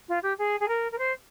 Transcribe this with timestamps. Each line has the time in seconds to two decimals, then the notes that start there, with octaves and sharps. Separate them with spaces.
0.08 F4
0.23 G4
0.38 G#4
0.60 G#4
0.68 A#4
0.92 A#4
0.98 C5